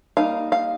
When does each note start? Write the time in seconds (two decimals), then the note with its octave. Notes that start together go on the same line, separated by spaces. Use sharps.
0.17 G3 A#3 D#4 F5
0.52 F5